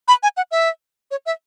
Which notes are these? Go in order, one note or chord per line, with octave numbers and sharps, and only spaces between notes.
B5
G#5
F#5
E5
C#5
E5